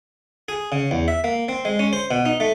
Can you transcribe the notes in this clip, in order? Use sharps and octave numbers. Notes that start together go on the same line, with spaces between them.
G#4
C#3
E2
E5
A#3
C4
G#3
C#4
C5
B2
D#4
A3